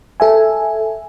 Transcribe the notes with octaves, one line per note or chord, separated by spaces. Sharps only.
A4 E5 G#5